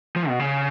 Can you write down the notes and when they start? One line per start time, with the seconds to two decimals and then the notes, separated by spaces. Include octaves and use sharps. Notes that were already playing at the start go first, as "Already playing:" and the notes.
0.16 F3
0.28 B2
0.40 C#3